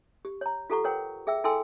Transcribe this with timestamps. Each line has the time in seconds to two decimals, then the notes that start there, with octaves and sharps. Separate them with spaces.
0.25 G4
0.41 C#5 A#5
0.70 F4 G4 A4 F#5 A#5 C#6
0.84 A#4 B4 C#5 F#5 G5
1.27 G#4 E5 G5 E6
1.44 E4 A4 G5 G#5 C6 E6